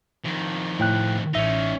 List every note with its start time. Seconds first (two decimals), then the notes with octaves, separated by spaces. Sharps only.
0.25 F2 D#3
0.79 A2 G5 F#6
1.34 A1 C#4 D#4 E5 A#6